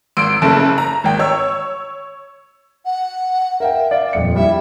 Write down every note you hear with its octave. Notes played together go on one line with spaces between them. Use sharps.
G#1 C6 E6 D7
F#1 C#3 A3 A5
A#5
G#1 G5
C#5 E6
F#5
A#4 E5 F5 G5
D5 F5
D#1 F2 C#7
G3 E4 E5